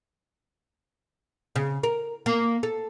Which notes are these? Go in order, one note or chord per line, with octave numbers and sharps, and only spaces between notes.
C#3
A#4
A#3
A4